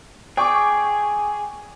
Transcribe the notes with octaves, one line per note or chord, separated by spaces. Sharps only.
G#4 D5 G5 C#6 D6